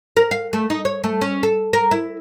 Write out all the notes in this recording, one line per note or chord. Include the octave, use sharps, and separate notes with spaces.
A#4
F5
A3
D#4
C#5
A3
C#4
A4
A#4
E4